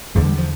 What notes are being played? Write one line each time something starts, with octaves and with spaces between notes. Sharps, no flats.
E2 D3 A3
G3
F3